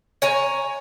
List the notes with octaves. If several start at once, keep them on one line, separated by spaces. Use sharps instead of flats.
C#5 G#5 A#5